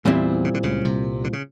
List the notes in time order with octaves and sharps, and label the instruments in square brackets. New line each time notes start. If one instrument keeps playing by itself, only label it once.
[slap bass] E2 E3 [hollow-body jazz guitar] A#2 G3 C4 E4
[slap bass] C#3
D3
C#2 C#3
C2 C3
D3
C#3